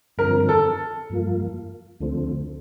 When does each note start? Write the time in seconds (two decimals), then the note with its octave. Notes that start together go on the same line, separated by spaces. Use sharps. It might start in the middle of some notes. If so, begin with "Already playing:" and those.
0.18 G2 D3 F3 C4 A#4
0.49 A4
1.10 G2 F3 A#3 F4
2.00 D2 D3 F3 A3 C4